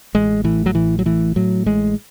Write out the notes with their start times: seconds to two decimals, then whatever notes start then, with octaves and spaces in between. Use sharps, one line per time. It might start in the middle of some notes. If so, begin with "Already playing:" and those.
0.15 A1 G#3
0.44 A2 E3
0.66 F#3
0.75 A1 E3
0.99 F#3
1.06 A2 E3
1.36 A2 F#3
1.66 A1 G#3